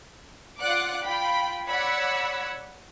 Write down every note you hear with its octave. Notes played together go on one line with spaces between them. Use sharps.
F4 D5 F#5 D6 F#6 D7
F4 G5 B5
C#5 D5 F#5 B5 E6 G#6